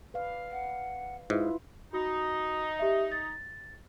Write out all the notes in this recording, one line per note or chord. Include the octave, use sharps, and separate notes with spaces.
B4 D5 F5
F#5
G#2 E4 F4 B4 E5
D#4 F#4
G4 E5
A6